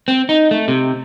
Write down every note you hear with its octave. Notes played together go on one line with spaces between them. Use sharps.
C4
D#4
A3
C3